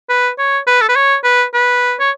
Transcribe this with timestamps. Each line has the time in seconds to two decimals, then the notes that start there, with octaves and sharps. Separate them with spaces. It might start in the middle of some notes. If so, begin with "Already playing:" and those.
0.10 B4
0.39 C#5
0.67 B4
0.82 A4
0.89 B4
0.96 C#5
1.24 B4
1.54 B4
2.00 C#5